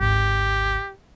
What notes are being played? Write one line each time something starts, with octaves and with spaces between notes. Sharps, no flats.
G#1 D2 G4